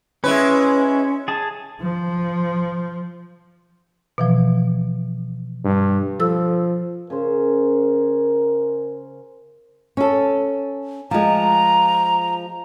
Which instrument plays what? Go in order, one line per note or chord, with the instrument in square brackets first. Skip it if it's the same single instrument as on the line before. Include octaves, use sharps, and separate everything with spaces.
[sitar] G#3 E4 B4 [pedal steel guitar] C#4
[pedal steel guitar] G#4 A5
[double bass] F3
[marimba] B2 E3 F3
[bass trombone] G2
[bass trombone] F3 [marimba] A4 E6
[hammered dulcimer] C#3 C5 [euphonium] A#4
[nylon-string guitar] C#4 A4
[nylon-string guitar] F3 G#3 [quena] A#5